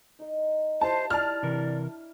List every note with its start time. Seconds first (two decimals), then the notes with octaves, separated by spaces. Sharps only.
0.19 D#4 D#5
0.81 D#4 E4 G4 C5 A5
1.10 D5 A5 F6
1.43 C3 E3 D4 A#4